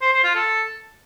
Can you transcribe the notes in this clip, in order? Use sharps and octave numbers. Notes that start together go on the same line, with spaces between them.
C5
C5
F4
A4